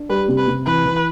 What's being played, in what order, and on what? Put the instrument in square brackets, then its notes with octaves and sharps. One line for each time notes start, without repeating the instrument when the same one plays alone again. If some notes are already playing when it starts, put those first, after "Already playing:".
Already playing: [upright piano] D4
[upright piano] G3 [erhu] B4
[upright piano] C3
[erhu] B4
[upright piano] C3
[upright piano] E3 [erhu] B4
[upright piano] E3